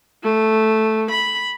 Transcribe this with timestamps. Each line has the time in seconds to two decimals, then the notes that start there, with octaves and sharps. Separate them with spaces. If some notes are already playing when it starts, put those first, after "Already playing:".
0.24 A3
1.11 B5